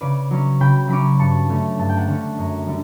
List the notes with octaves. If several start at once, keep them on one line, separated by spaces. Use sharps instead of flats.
C#3 B4 D5
F#3 C#4
C#3 G5 B5
F#3 C#4 B5 D6
G2 A5 C#6
D3 A3 C#4
G2 A5
G5
F#5 A5
D3 A3 C#4
F#2
D3 G3